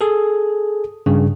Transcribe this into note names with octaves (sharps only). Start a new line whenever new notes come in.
G#4 A4
G2 C#3